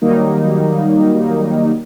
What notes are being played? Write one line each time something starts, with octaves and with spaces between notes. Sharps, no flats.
D#3 F#3 G3 A#3 D#4